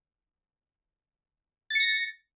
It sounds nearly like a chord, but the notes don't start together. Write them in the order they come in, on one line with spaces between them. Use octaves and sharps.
A6 C#7 A#6